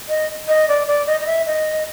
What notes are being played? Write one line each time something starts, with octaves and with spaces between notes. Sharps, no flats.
D#5
D#5
D5
D5
D#5
D#5
E5
D#5